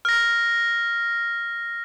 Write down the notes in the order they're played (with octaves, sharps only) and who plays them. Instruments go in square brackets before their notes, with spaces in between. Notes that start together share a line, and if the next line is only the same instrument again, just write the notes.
[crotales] F6 A#6